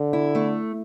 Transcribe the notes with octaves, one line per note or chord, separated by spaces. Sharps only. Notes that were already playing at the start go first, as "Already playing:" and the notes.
Already playing: D3
E4
A3